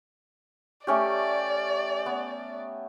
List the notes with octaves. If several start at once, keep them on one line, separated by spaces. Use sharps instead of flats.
A3 C#4 G4 D5
B3